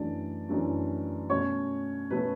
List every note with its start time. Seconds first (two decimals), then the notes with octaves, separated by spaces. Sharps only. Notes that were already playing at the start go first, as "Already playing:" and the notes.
Already playing: F#2 E3 A3 D4 D5
0.49 F#2 E3 A3 D4
1.30 B2 A3 C#4 C#5
2.10 B2 A3 C#4 B4